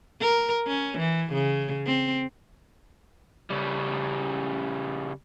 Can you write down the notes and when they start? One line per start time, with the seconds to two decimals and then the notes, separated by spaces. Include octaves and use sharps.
0.21 A#4
0.67 C#4
0.98 E3
1.33 C#3
1.86 C4
3.50 C#3 G3